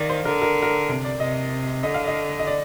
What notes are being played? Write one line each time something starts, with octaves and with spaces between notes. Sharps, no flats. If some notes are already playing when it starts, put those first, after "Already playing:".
Already playing: D#3 D5 D#5 F5
C5
D3 A#4
A#4
A#4
C3
D5
C3 D#5
D3 D#5
F5
D#5
D#5
D5